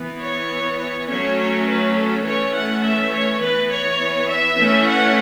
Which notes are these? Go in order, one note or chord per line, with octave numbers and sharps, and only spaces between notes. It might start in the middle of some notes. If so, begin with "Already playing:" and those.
Already playing: E3 B3
C#5
C#5
F#3 A3 C#4 C#5
C#5
B4
A4
E3 A3 C#4 C#5
F#5
E5
C#5
E3 B3 B4
C#5
E5
E3 A3 C#4
F#5